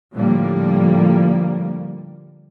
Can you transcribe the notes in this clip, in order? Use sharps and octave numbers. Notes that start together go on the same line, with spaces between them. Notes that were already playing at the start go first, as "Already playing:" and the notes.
A2 D3 F3 G3 A#3